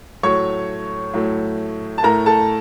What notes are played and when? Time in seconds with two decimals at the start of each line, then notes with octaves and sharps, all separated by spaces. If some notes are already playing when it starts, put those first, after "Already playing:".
0.23 A2 F#3 A3 C#5 C#6
1.14 A2 F#3 A3
1.98 A5
2.03 A2 A3 A#4 A#5
2.26 A4 A5